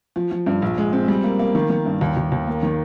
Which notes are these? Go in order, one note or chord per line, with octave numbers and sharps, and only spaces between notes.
F3
F3
G2
A#1
G#3
C4
G3
A#3
A#3
D#3
D#3
G2
D#2
D#2
D#2
A#3
D#3